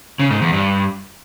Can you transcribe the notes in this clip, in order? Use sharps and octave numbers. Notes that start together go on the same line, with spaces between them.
C#3
G#2
E2
G2